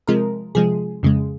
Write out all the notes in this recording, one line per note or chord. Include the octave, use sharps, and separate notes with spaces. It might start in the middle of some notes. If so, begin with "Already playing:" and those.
C3 F3 G#3 A#4
C3 F3 G#3 G#4
F2 C#3 G#3